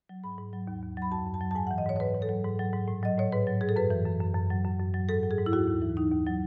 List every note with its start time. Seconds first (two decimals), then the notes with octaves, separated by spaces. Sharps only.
0.09 F#3
0.24 G#2 B5
0.38 G#2
0.53 F#3
0.67 D#2
0.82 D#2
0.97 F#3 B5
1.12 F#2 A5
1.26 F#2
1.34 A5
1.41 F#3
1.51 A5
1.56 G#2 G#5
1.67 E3 F#5
1.78 D#5
1.85 G#2 C#5
1.96 C#5
2.00 G#2 B4
2.15 G#2
2.22 A4
2.29 F#3
2.44 G#2
2.59 F#3
2.74 G#2
2.88 A2
3.03 F#3 D#5
3.18 A2 C#5
3.32 G#2 B4
3.47 F#3
3.61 G#2 G#4
3.69 A4
3.76 F#2 B4
3.90 E3
4.05 F#2
4.20 F#2
4.35 F#2
4.50 F#3
4.65 F#2
4.80 F#2
4.94 F#3
5.09 G#2 A4
5.23 F#3
5.31 G#4
5.38 G#2
5.46 E4
5.52 D#2 F#4
5.68 D#2
5.82 E3
5.97 D#2 D#4
6.12 D#2
6.26 F#3